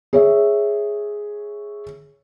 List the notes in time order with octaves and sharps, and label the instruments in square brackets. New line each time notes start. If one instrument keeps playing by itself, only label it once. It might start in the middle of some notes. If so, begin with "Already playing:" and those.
[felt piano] G#4 C#5 E5